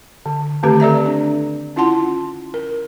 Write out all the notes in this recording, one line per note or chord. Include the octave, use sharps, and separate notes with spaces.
D3
D3 D#3 A3 C4 G4 B4
A4 D5 E5 A#5
D4
C#4 E4 F4 F#5 A5 C6
A#4